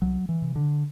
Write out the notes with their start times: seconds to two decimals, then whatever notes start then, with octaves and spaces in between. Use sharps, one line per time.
0.02 C2 F#3
0.29 E3
0.42 C3
0.56 D3